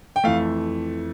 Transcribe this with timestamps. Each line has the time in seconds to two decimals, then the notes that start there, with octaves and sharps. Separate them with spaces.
0.16 G5
0.24 F2 E3 A3 F5